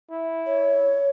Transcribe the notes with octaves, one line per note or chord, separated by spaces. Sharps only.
E4
C#5